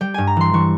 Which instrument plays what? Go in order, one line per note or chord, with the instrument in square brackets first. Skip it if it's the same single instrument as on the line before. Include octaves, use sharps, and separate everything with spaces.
[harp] G3 G5
G2 G#5
A#5
E3 C6
E3 C#6